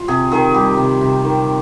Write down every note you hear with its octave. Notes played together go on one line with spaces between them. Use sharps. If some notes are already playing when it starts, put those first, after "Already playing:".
Already playing: F4
C3 G#4
D#3 G#4
G3 G4
C3
C3
D#3